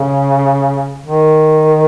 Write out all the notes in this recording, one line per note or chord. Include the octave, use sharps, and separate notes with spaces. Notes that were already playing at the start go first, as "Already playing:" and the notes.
Already playing: C#3
D#3